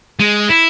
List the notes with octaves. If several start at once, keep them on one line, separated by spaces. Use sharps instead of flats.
G#3
E4